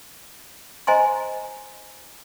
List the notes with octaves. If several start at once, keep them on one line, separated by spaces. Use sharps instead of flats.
C5 D#5 G#5 A#5 C6